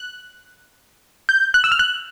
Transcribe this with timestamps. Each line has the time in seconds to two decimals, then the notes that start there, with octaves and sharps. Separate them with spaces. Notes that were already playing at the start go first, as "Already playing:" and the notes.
Already playing: F#6
1.29 G6
1.54 F#6
1.64 E6
1.72 F6
1.79 F#6